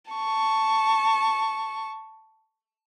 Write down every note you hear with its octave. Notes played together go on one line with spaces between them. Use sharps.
A5 C#6